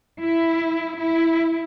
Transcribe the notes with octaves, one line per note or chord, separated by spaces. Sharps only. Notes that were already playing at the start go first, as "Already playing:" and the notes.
E4
E4